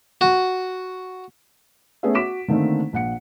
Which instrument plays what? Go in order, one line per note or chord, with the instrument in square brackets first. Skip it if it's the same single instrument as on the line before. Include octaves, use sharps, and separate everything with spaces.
[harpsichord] F#4
[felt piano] A3 B3 C#4 G#4 B4 E5
F#4 D6 B6 D7 E7
D3 D#3 A3 A#3 C4 D#4
A#1 F#5 C#7